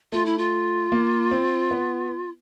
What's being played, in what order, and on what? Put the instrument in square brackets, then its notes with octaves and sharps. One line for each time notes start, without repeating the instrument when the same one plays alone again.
[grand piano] A3 [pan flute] F4
[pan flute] E4
F4
[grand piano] A#3
C4
B3